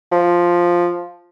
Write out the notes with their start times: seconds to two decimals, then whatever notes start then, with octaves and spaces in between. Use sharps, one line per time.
0.12 F3